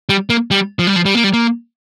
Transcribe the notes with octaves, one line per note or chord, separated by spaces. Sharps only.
G3
A#3
G3
F3
G3
F3
G3
A#3
G3
A#3